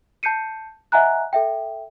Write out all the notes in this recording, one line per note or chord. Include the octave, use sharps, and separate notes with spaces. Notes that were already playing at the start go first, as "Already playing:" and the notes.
A5 G6 C7 C#7 D#7
D#5 E5 F#5 G#5 A#5 F#6
A4 E5 G5